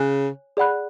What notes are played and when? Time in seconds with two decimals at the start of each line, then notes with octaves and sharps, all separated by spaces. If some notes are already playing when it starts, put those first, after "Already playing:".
Already playing: C#3 C#5 G#5 F#6
0.57 G#4 D5 F#5 B5 F#6